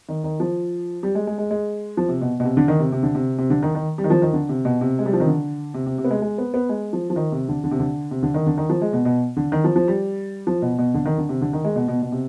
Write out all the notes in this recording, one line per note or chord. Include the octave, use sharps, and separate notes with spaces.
D#3
D#3
F3
G3
G#3
G#3
G#3
G#3
F3
C3
B2
B2
C3
D3
D#3
C3
C3
D3
C3
C3
D3
D#3
D#3
G3
D#3
F3
D#3
D3
C3
B2
C3
G#3
G3
F3
D#3
D3
C3
C3
C3
B3
G#3
G#3
B3
B3
G#3
F3
F3
D#3
C3
D3
D3
C3
D3
C3
D3
D#3
D3
D#3
F3
G#3
B2
B2
D3
D#3
F3
F3
G3
F3
B2
B2
D3
D#3
D3
C3
D3
D#3
G#3
B2
B2
B2
C3